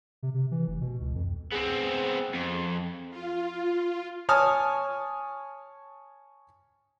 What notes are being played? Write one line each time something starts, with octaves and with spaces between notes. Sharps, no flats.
C3
C3
E3
F1
B2
C#2
F2
B3 C4 G#4
F2
F4
C#5 G#5 A5 D#6 F6